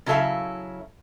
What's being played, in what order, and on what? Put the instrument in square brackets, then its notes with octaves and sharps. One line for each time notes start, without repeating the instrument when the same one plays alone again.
[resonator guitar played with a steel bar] C#3 F#3 E4 A4 E5 F5